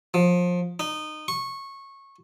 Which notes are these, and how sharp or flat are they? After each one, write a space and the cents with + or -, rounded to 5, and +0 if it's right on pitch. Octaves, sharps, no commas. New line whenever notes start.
F3 +25
D#4 -20
C#6 -20